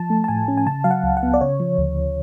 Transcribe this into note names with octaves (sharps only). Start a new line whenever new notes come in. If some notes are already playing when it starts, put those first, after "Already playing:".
Already playing: F3 A5
A3
A5
A2 G#5
C#4
G#5
C#3 A5
F#3 F5
F#5
C#2
F#5
B3
D5
C#3 C#5
F3
D2